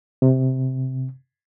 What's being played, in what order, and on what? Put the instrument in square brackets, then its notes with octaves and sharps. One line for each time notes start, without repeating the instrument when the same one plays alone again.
[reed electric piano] C3